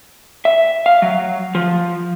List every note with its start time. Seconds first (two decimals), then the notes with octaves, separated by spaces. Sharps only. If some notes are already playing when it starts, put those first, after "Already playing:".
0.45 E5
0.86 F5
1.02 F#3
1.55 F3